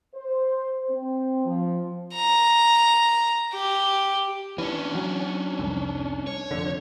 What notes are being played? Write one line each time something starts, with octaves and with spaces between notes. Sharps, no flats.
C5
C4
F3
A#5
G4
E3 C#4 D4
F#3
C2 F2
C#5
F1 F2 D3